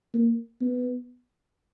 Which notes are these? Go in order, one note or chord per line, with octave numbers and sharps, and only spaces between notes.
A#3
B3